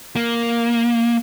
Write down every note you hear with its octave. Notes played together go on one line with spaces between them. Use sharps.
A#3